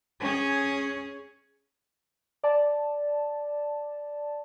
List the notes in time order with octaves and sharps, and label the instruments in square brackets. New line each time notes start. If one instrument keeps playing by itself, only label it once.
[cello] C#4 G#4
[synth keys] D5 A5